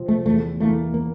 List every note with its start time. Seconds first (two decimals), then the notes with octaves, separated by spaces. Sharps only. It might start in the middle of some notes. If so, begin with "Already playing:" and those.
Already playing: C3 F3 C4
0.08 A3
0.26 E2 A3
0.60 E3 A3 A#3 E4
0.94 A#3